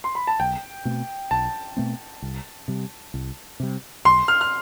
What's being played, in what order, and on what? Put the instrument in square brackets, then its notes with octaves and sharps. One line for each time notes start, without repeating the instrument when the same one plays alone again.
[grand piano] C6
B5
A5
[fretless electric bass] B1 [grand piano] G5
[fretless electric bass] B2 A3 C4
[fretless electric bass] B1 [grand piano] A5
[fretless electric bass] B2 A3 C4
C2
C3 G3
C2
C3 G3
[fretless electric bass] B1 [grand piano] C6
[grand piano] F6
F6